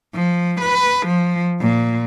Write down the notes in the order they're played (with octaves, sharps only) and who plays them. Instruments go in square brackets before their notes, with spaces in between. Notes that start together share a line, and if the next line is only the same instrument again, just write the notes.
[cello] F3
B4
F3
A#2